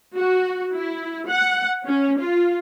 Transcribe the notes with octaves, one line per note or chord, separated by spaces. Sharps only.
F#4
E4
F#5
C#4
F4